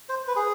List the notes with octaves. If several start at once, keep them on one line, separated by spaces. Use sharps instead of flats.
C5
B4
G#4